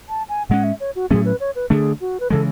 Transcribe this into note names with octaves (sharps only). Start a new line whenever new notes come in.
A5
G#5
A2 G#3 C#4 F#5
E5
C#5
F#4
A2 F#3 A3 C#4 G#4
B4
C#5
B4
D3 A3 D4 G#4
F#4
B4
C#3 E3 G#3 A4